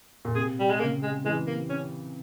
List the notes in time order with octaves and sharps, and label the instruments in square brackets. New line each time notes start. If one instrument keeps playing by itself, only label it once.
[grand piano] A#2
[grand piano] C3 [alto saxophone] G#4
[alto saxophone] G3
G#3
[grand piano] C#3 [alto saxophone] A#3
[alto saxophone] G#3
[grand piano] E3 [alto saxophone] G#3
[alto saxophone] A#3
C#4